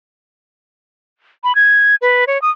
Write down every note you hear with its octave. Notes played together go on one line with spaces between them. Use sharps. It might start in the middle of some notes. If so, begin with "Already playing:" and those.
B5
G#6
B4
C#5
D#6